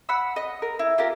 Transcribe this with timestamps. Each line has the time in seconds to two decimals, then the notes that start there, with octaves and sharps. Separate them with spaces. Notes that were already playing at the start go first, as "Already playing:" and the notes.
0.09 F#5 B5 E6
0.36 D#5 D#6
0.62 A#4
0.79 E4
0.98 F4 G4 A#4